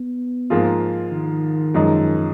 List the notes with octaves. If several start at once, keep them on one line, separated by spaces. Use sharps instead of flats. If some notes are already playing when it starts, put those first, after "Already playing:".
Already playing: B3
G#2 F3 A#3 F4 G#4
D#3
F#2 F3 G#3 D#4